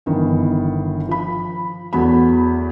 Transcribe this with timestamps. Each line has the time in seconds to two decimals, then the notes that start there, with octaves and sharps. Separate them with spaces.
0.06 G1 D#3 E3 B3
1.09 F3 B5
1.93 E2 F#3 A3 B3 F#4 B5